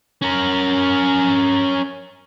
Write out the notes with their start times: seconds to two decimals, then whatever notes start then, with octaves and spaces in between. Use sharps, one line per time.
0.22 C#4 A#4